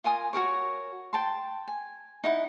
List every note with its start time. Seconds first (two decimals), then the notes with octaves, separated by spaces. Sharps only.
0.04 F4 A#4 G#5 D#6
0.33 F#4 G#4 A#4 C#5
1.13 G5 A5 C6
1.68 G#5
2.24 D#4 E4 F#5